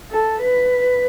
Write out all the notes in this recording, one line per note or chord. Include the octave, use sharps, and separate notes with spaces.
A4
B4